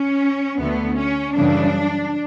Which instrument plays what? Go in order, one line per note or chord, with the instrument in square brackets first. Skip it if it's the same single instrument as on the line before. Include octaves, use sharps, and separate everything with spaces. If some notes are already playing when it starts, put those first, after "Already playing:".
Already playing: [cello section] C#4
D2 D3 A3 B3
C#4
F#2 C#3 E3 G3 D4